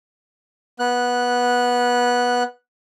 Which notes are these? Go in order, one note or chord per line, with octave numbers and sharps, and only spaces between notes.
B3 F#6